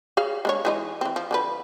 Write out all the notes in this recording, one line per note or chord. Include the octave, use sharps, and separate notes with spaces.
G#4 C#5 F5
G#3 D4 C#5
E3 G#3 D#4
E3 C4
F3
D3 F3 B4